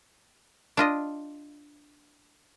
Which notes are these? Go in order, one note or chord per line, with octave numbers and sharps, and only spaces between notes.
D4 F4 D#5